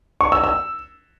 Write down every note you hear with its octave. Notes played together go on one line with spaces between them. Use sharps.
C#6
E6
E6